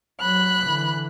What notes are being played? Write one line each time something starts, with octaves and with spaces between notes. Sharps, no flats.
F#3 B5 F#6
D3 E3